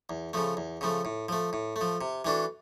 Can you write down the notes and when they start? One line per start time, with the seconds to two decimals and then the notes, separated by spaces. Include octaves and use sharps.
0.10 E2
0.33 C#3 F3 A3
0.57 E2
0.81 C#3 F3 A3
1.05 A2
1.29 F3 A3
1.53 A2
1.76 A3
1.81 F3
2.01 C3
2.25 E3 A3 D4 F#4